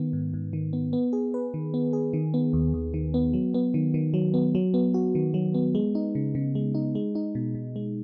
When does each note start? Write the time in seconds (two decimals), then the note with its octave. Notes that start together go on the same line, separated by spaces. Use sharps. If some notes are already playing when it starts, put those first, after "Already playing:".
Already playing: D#3 B3
0.13 G#2
0.34 G#2
0.53 D#3
0.73 B3
0.93 B3
1.13 G#4
1.34 B4
1.54 D#3
1.74 B3
1.93 G#4
2.13 D#3
2.34 B3
2.53 D#2
2.74 D#2
2.94 D#3
3.14 B3
3.33 F#3
3.54 B3
3.74 D#3
3.94 D#3
4.14 F#3
4.34 B3
4.55 F#3
4.74 B3
4.94 F#4
5.15 D#3
5.34 F#3
5.54 B3
5.75 G#3
5.95 D#4
6.15 C#3
6.35 C#3
6.55 G#3
6.75 D#4
6.95 G#3
7.15 D#4
7.35 B2
7.55 B2
7.76 G#3